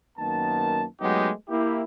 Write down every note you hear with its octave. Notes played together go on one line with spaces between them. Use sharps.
F#2 D#3 A#3 B3 A5
F#3 G#3 A3 B3 D#4 G4
A#3 E4 G4